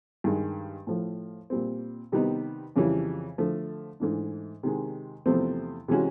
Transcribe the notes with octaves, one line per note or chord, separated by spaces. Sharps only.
G2 D#3 G#3
A2 F3 A3
A#2 G3 C4
C3 D#3 G3 B3 D#4
F2 C#3 E3 G3
D3 F3 A3
G#2 E3 A3 D4
C3 D#3 G#3
E2 C3 F3 A3 C4
C3 E3 G#3 C#4 F#4